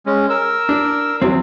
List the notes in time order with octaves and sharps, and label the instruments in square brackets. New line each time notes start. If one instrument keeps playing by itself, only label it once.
[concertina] G#3 C#4
A#4 E6
[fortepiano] D4
[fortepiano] E2 F#3 [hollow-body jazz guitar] C4